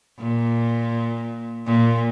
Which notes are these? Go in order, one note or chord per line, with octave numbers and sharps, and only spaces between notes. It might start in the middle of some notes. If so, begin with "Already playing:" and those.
A#2
A#2